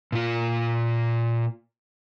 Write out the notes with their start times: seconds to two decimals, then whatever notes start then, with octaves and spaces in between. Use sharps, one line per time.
0.12 A#2 F4